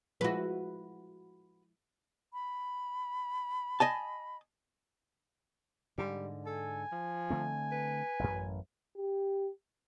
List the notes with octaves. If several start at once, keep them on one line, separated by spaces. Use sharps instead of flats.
F3 G#3 E4 F#4 B4
B5
D#5 G#5 A5
G#2 D3 G3
A4 G#5
F3
D3 A3 C4
B4
A1 F#2
G4